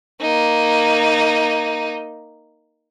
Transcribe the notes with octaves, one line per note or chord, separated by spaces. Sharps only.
A#3 D#4